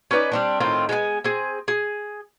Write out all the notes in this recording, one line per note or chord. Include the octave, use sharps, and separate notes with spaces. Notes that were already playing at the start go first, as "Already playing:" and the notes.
C#4 D#4 B4 D5
G3 C4 D4
A2 D#3 C4 F4
G#3 B3 E4 G#5
C4 G#4
G#4